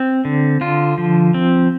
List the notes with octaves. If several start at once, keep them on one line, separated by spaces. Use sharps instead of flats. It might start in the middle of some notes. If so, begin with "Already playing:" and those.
Already playing: C4
D3
D3 F4
F3
C4